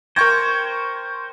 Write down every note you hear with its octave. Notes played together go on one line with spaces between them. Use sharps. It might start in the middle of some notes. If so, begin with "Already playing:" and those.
A#4 C5 C#5 G5 C#6 A#6